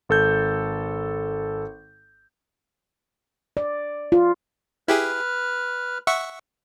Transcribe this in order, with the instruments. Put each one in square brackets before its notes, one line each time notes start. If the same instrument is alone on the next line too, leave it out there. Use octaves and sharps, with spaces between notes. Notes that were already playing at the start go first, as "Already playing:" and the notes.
[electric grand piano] G#1 A4 G6
[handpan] D5
F4
[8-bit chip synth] E4 G4 G#4 [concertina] B4 F6
[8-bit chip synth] E5 F#5 C#6